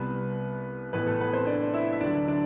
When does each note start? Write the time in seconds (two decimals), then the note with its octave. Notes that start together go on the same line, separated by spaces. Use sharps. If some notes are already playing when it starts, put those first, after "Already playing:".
Already playing: C2 C3 G3 B3 B4
0.93 A1 A2 E3 B3 B4
1.06 A3 A4
1.20 B3 B4
1.33 C4 C5
1.47 D4 D5
1.74 E4 E5
1.93 E5
2.00 D2 D3 F#3 D4 D5
2.28 D4 D5